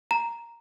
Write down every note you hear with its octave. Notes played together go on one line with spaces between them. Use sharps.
A#5